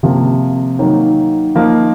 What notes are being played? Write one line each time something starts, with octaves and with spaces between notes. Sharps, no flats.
C3 F3 A#3
D#3 F#3 A#3
F3 A#3 D#4 A#4